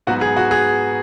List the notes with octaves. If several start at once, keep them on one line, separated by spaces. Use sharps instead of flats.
G#2 F#3 B3 F#4
G#4
F#4
G#4